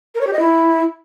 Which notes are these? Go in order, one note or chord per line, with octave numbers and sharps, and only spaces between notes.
A#4
C#5
G4
D#5
E4